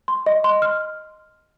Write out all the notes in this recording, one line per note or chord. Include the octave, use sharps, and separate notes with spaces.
C6
D#5
C6
F6